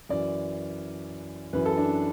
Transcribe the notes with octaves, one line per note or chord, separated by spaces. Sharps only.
F#2 E3 D5
F#2 E3 B4
A4
D4